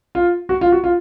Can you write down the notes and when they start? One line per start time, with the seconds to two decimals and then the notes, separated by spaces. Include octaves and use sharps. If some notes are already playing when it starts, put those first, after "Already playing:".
0.15 F4
0.49 F#4
0.61 F4
0.72 F#4
0.84 F4